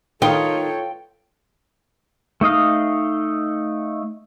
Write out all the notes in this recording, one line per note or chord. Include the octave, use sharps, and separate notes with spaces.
D#3 D#4 F4 A4 C#5 G5
A3 D#4 D#5 F5